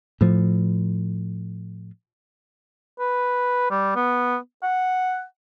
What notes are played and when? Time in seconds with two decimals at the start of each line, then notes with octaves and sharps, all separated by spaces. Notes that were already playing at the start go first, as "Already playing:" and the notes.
0.21 A2 F3
2.99 B4
3.70 G3
3.95 B3
4.63 F#5